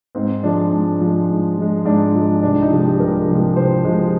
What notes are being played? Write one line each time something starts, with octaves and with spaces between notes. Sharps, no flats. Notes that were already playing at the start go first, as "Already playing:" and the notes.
G#2 C4
F3 G#3 D4
G#2
F3 G#3
G#2
F3 G#3
G#2 D4
F3 G#3
C2 D4
D#4
C3 F3 G#3
G4
C2 A#4
C3 F3 G#3
C2 C5
C3 F3 G#3